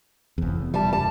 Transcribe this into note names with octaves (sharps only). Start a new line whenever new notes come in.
F1 E2
G3 A5
A5